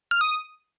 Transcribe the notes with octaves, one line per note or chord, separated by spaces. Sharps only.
F6
D#6